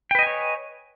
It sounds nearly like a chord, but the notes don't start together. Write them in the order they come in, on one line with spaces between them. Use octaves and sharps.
G5 B4 D#5 G#5 C#5